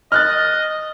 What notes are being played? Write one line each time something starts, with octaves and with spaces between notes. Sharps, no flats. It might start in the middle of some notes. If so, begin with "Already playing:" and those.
D#5 F6 F#6 A6